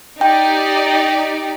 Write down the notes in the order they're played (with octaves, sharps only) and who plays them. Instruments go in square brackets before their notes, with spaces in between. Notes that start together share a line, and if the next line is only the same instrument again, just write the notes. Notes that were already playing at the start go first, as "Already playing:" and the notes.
[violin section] D#4 G4 D5 [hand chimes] G5